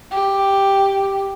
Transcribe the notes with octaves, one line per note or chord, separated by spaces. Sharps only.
G4